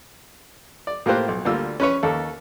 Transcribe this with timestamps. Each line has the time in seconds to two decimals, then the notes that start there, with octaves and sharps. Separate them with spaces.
0.87 D5
1.06 A2 A#3 F4 G4 C5 F#6
1.28 B1
1.45 D2 G3 A#3 F4 E6
1.80 C#4 B4 C#5
2.03 D#2 A4